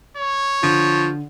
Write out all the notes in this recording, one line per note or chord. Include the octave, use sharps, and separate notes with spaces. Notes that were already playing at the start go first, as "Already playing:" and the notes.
C#5
D3 F3